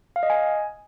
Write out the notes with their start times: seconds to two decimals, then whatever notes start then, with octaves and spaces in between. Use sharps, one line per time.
0.16 F5
0.23 D#5
0.30 G#5